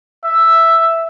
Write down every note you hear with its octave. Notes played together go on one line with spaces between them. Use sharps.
E5